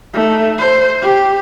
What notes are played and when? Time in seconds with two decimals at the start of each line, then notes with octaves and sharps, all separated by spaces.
0.14 A3 D#4
0.58 C5
1.02 G4